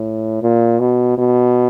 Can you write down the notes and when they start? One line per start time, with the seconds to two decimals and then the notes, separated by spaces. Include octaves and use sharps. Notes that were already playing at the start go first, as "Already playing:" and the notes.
Already playing: A2
0.42 A#2
0.80 B2
1.18 B2